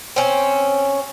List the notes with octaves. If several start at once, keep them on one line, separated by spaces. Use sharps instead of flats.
C4 C#4